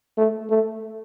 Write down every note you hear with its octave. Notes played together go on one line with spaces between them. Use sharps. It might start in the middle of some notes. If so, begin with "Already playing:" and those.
A3
A3